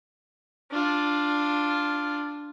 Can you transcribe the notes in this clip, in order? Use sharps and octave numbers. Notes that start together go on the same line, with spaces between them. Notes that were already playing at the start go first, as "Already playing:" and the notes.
D4 F4